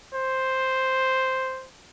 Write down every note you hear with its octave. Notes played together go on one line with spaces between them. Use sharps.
C5